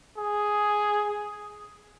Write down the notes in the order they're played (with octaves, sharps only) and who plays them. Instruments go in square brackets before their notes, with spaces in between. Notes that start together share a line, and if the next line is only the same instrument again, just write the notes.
[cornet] G#4